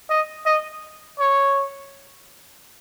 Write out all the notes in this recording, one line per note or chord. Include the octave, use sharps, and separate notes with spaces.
D#5
D#5
C#5